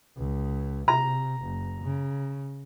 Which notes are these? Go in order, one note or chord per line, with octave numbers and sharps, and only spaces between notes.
C#2
C3 A#5
F#1
C#3